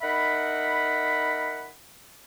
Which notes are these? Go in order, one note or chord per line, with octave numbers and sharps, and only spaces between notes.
D#4 A#4 E5 F#5 B5